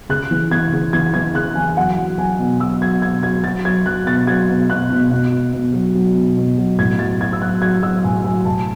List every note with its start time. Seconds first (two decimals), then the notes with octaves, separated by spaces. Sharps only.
0.09 C#3 F#6
0.31 E3
0.51 E3 G#6
0.72 C#3
0.93 E3 G#6
1.14 E3 G#6
1.34 C#3 F#6
1.55 E3 G#5
1.77 F#3 F#5
1.97 F#3
2.18 F#3 G#5
2.39 B2
2.60 F#3 E6
2.81 F#3 G#6
3.02 B2 G#6
3.23 F#3 G#6
3.44 F#3 A6
3.65 F#3 G#6
3.86 F#3 F#6
4.07 B2 A6
4.27 F#3 G#6
4.49 B2
4.70 B2 F#6
4.90 B2
5.11 B2
5.32 B2
5.53 B2
5.74 F#3
5.95 F#3
6.15 B2
6.37 B2
6.58 F#3
6.79 A2 G#6
6.99 F#3 A6
7.21 F#3 G#6
7.33 E6
7.42 F#3 F#6
7.62 F#3 G#6
7.83 F#3 E6
8.04 A2 G#5
8.24 F#3 G#5
8.45 A2 A5